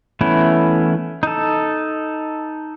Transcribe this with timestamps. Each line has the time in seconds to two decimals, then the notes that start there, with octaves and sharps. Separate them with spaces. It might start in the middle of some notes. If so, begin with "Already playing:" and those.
0.21 E3 A3 B3 C#4 E4
1.23 D#4 A4